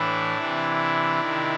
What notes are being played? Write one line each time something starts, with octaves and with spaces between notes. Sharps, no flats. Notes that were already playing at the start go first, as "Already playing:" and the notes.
Already playing: A2 E3 D4 E4
C3 E3
C3 D#3